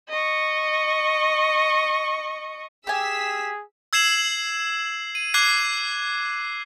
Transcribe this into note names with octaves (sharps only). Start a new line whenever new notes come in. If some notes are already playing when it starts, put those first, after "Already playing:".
D#5 C#6
G4 G#4 G#5 E6 B6
E6 G#6 C7 E7 F#7
D#7
D6 F#6 G#6 C7